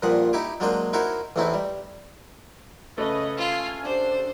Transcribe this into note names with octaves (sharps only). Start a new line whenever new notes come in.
G2 A#2 F3 F#5 D#6
D#4 E4 G4
F#3 G#3 A#3 D4 C5 D#5
D#4 E4 F#4 A#4 C5 C#5
A1 E2 A3 C4 D#4 E4
G3
C#3 A3 B4 C#5 D#5
F4 F5 G#5
D4 G4 C5